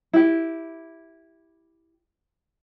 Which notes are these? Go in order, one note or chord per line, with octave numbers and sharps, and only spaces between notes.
E4 G4